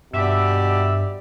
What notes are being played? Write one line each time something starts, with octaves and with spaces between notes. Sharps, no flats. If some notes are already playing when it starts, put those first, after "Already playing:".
G2 B2 G4 D5 E5